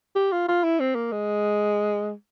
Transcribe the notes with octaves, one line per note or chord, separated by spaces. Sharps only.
G4
F4
F4
E4
C4
A#3
G#3